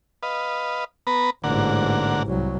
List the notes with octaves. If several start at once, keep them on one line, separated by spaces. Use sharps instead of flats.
B4 D#5 F5
B3 B4 A#5
A1 G#2 D3 A#3 F#5
C2 F#3